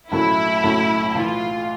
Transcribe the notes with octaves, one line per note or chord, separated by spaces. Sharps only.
B1 A2 F#3 A3 C#4 E4
B1 A2 F#3 A3 C#4
B1 A2 E3 F4